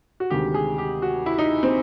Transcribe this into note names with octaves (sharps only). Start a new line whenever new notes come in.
F#4
D2 C3 D#3 G#3 G4
G#4
G4
F#4
E4
D#4
C4